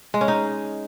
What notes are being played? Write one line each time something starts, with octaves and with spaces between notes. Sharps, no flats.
G#3
C#4
D#4